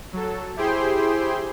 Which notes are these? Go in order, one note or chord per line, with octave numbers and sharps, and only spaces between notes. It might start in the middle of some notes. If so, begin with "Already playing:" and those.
F#3 A4
E4 G4 G#4 C5 G5 C6